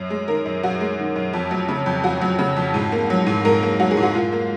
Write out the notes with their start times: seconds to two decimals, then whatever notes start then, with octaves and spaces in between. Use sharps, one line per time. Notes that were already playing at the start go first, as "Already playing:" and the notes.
Already playing: F#2
0.10 G#3
0.28 D#3 A#4
0.46 F#2
0.63 F#2 F#4
0.81 G#3
0.99 D#3
1.16 F#2
1.33 F2
1.51 F#3
1.68 C#3
1.86 F2
2.03 F2 F#4
2.21 F#3
2.39 C#3
2.57 F2
2.74 G#2
2.92 A#3
3.10 F#3
3.27 G#2
3.45 G#2 A#4
3.63 A#3
3.80 F#3 F#4
3.91 G#4
3.97 G#2
4.03 F#4
4.15 G#2 F4
4.32 A#3